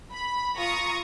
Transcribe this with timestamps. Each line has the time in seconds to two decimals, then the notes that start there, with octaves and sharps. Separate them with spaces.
0.12 B5
0.57 F4 A#5 C#6 D#6